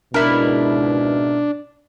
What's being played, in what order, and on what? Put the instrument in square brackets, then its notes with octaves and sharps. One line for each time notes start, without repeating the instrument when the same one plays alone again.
[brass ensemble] C#2 G#2 B2 [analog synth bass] D4 [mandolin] E4 A#4